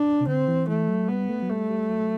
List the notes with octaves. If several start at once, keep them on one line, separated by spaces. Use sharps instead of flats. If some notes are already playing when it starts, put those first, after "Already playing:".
Already playing: D4
C3
D3 C4
E3
E3 A3
F#3
G3 B3
A3
F#3
G3 A3
G3
F#3